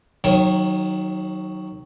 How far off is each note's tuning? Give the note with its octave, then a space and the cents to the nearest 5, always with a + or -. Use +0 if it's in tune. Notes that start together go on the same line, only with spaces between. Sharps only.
D#3 +0 F#3 +0 C#5 -45